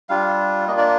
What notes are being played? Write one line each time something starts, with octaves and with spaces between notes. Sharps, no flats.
G3 D4 F4 F5
A#3 D4 F4 D#5
D5